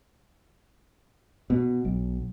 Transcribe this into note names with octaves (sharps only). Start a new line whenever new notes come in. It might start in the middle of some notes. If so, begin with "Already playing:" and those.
B2
B1